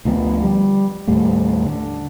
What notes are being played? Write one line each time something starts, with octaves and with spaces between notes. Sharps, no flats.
D2 D3 F3 B3
G3
D#2 A2 G3 A3
D3